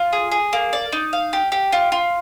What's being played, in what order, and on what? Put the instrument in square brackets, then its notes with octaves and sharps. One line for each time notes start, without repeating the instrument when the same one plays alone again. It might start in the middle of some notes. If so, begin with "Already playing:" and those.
Already playing: [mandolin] F4
G#4
G#4
A#3
D5
D#4
F5
G4
G4
F4
F4